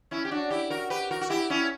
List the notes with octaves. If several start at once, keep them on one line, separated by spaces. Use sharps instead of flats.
C#4 E4
G4
D4 F#4
E4 G4
F#4 A#4
G4 B4
F#4 A#4
F#4
E4 G4
C#4 E4